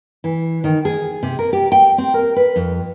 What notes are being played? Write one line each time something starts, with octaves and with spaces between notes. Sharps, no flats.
E3
D#3
G#4
C3
A#4
G4
G5
C4
A#4
B4
F2